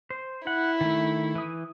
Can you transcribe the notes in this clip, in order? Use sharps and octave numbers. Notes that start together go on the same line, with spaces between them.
C5
E4 F#5
D#3 A3
E3 D#6